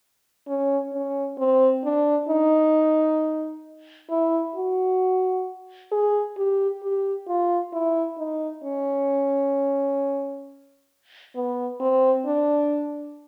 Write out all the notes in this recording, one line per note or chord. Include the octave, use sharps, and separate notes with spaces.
C#4
C#4
C4
D4
D#4
E4
F#4
G#4
G4
G4
F4
E4
D#4
C#4
B3
C4
D4